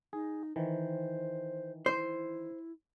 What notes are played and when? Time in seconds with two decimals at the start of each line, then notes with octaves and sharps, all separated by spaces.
0.13 D#4 G#4
0.56 D#3 E3 C5
1.86 E4 C5